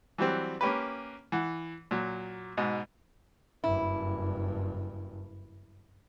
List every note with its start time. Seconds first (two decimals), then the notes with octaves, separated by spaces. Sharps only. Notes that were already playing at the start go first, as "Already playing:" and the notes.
0.18 E3 F#3 G3 C4
0.61 A#3 C#4 G4 B4
1.32 E3 F#5
1.91 A#2 F#3
2.57 G#2 B2
3.64 F#1 G2 E4